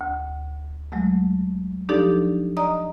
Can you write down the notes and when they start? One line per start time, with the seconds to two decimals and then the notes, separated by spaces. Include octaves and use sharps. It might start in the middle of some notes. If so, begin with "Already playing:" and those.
0.01 D2
0.92 F#3 G#3 A3
1.89 F3 D4 D#4 G4 A4 D5
2.57 D5 D#5 A#5 D#6